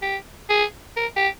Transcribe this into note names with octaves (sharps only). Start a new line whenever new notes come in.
G4
G#4
A#4
G4